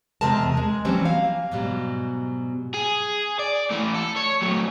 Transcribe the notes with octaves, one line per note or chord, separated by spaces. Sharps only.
E2 C3 G#3 C4 A#4 A5
G#3
E3 F#3 G3 C4 C#4
A#3 F5
G#2 B2 F#3 G3
G#4
D5
E3 A3
A4
C#5
F#3 A3